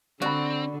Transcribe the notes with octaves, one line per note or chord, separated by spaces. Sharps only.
D3 C4 F#4 D5 B5